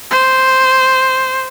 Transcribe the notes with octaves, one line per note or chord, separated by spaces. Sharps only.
C5